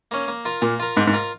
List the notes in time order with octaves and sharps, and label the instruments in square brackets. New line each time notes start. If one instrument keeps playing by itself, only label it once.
[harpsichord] A#3 C#4
A#3
F4 A#4
[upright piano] A#2 [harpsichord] A#3
[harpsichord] F4 A#4
[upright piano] G#2 [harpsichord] A#3
[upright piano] G#2
[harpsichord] F4 A#4